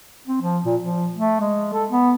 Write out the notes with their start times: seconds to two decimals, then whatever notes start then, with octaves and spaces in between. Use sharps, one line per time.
0.27 C4
0.42 F3
0.66 A#2
0.81 F3
1.16 A3
1.40 G#3
1.73 A4
1.90 B3